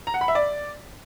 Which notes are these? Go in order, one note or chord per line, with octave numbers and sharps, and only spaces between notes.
A#5
F#5
B5
E5
D5